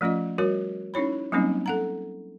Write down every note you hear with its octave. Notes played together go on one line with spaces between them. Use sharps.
F3 A3 C#4 F4 D#5
G3 F#4 A#4 C#5
C#4 D#4 E4 C#5 B5
F#3 G3 A#3 C4 C#4 D#4
A4 F#5 A#5